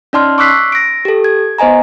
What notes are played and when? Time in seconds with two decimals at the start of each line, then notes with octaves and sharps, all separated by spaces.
0.13 C#4 D#4 D5 A5 C6 F6
0.38 C#6 D6 E6 F#6 B6 C7
0.72 A#6 D7
1.05 G4 A4
1.24 G#6
1.58 B3 C5 D#5 G#5 A#5